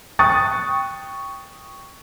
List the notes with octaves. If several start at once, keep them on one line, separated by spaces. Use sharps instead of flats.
G5 C#6 D#6 F#6 A6